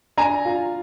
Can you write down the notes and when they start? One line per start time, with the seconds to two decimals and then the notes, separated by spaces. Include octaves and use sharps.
0.18 D4 G#5 A#5
0.45 F4